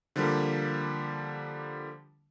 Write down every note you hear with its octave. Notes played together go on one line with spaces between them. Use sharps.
D3 F3 G3 A#3